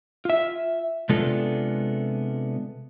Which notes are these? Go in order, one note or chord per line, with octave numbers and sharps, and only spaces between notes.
F4 E5
C3 G#3 B3 D4 F4 A4